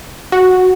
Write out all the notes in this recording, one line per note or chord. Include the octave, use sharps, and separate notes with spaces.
F#4